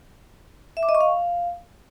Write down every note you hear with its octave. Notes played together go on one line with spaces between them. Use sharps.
E5
D6
D#5
C#6
F5